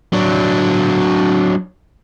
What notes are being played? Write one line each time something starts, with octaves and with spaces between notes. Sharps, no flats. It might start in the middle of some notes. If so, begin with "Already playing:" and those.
F#3 D4